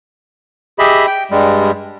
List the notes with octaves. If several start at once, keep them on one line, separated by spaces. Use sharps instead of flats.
G4 G#4 D#5 E5 B5
G5
G2 G3 G#3